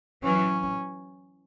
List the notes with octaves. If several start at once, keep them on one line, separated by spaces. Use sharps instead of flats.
E3 F#3 C#4